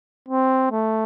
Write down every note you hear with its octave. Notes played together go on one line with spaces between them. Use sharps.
C4
A3